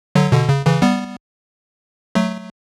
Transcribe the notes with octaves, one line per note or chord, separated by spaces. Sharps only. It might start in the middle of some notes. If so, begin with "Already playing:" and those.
D3 F#3
B2 D3
C#3
C#3 E3
G3 B3
F#3 A3